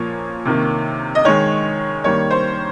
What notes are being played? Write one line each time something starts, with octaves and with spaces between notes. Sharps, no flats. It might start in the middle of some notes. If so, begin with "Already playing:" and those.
Already playing: A#2 F3 A#3 C#5
C3 D#3 A#3
D#5
D#3 G#3 C#5
D#3 G3 A#3 C#5
C5